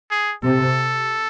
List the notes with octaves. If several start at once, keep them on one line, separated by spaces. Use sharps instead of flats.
G#4
C3 A4